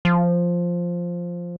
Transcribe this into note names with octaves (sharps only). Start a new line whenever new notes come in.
F3